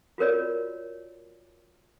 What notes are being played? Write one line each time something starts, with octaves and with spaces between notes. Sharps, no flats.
F4 F#4 A#4 C#5 D5